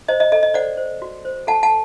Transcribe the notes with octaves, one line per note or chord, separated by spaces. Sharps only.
C5 D#5
D#5
A4 D#5
D#5
C5 D5 F#5
C5
F#4
C5
A4 F#5 A5
F#5 A5